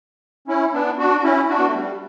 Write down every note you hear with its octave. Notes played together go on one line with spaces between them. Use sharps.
C#4 E4
B3 D4
D4 F#4
F#4
C#4 E4
D4 F#4
B3
A3
G3